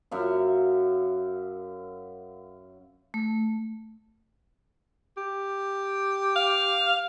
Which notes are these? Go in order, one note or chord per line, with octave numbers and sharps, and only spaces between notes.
F#2 E5 F5
A3
G4
F5